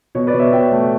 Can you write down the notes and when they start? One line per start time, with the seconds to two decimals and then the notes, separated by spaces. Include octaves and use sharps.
0.15 B2 C#5
0.27 B4 D5
0.34 B2
0.39 C#5 E5
0.52 B2 E5 G5
0.71 A3